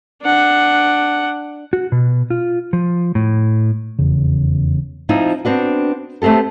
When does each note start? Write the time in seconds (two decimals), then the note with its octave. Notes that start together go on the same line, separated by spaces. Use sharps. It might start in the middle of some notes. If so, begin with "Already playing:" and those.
0.22 D4 F#5
1.73 F#4
1.92 B2
2.30 F4
2.73 F3
3.15 A2
3.99 F1 E2 C#3
5.09 F3 C4 D#4 E4
5.45 B3 C4 D4 F#4
6.22 A3 B3 C4 G4 A4